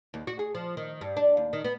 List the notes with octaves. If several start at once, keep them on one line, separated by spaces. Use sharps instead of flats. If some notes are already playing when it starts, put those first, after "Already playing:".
D#2
F#4
G#4
F3
D#3
G2
D4
D#2
D#3
B3